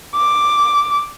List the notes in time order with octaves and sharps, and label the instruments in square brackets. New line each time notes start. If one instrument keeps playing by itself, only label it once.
[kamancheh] D6